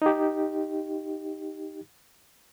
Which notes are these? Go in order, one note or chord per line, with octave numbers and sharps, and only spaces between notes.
D#4 G4